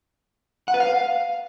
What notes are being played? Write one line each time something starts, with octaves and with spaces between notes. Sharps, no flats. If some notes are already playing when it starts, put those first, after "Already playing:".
F#5
B4
F5